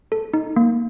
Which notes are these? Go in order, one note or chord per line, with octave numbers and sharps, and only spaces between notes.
A4
D#4
A#3